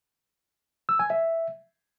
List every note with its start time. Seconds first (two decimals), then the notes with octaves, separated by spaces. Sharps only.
0.89 E6
0.99 G#5
1.10 E5